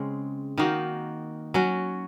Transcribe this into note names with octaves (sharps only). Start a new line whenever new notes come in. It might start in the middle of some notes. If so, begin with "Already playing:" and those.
Already playing: C#3 G#3 C4
D#3 A#3 D#4 F#4
F#3 C#4 F#4